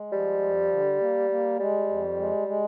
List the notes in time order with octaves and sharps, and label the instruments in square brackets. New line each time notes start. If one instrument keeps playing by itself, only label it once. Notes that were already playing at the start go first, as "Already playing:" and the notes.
Already playing: [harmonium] G#3
[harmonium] F3 [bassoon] G3
[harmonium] F2
D3
A#3
A#3
[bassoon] G3 [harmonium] G#3
[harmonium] F2
G#3
G#3